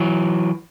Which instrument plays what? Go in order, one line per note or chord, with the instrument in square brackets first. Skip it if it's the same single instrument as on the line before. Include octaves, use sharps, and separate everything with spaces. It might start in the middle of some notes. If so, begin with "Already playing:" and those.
Already playing: [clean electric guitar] E3 F#3